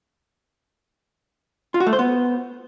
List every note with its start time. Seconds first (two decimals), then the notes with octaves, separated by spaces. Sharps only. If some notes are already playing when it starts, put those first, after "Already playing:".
1.74 F4
1.80 F#4
1.87 A3
1.93 C5
1.99 B3